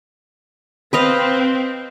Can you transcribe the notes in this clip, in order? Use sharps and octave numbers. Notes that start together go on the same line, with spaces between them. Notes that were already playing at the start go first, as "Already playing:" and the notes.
C4 B4 D#5 F5